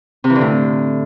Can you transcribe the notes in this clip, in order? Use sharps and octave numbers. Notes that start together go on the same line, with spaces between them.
C3
E3
D3
A2